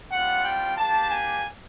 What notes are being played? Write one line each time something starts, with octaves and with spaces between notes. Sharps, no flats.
G3 C4 F4 F#5
G5
A#3 D4 G4 A5
G#5